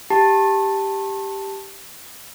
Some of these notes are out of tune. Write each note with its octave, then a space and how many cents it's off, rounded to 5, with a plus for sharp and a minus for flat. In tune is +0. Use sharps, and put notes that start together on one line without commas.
G4 +0 A5 +5